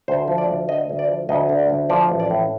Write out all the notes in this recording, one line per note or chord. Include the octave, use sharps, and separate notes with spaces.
D2 C5
F3
D5
D2
D3 D#5
D2
D5
F3
D2 D#5
D3
D5
D2
F3 D5
A1
D5
A2